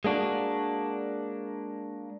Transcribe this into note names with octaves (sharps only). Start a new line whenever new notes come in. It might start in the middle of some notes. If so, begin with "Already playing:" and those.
G#3 A#3 D4 F#4